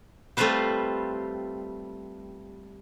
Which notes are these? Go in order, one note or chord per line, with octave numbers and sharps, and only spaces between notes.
G3 A3 C4 F4 B4 C5